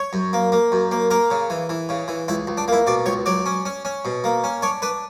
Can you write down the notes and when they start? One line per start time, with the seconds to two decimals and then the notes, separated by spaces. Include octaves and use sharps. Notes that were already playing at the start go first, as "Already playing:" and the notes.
Already playing: C#5
0.13 F#2
0.33 A#3
0.52 A#3
0.72 F#2
0.91 A#3
1.10 A#3 A#4
1.30 C#3
1.50 E3
1.69 E3
1.89 C#3
2.08 E3
2.28 C#2 E4
2.47 C#2
2.57 D4
2.68 A#3 E4
2.87 B2 D5
3.06 C#2 C#5
3.26 F#3 D5
3.46 C#4
3.65 C#4
3.85 C#4
4.05 B2
4.24 A#3
4.44 C#4
4.62 D4 C#5
4.82 D4 B4